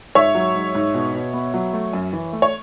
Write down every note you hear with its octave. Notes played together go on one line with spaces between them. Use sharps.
G#2 C#5 E5
F#3
G#2
G#2
B2
B2
B3
F#3
A3
F#2
E3
A3
C#5